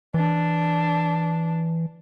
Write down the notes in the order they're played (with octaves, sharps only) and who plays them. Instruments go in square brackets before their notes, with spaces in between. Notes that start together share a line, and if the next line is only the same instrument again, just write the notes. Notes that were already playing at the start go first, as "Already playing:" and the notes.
[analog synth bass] E3 [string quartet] D4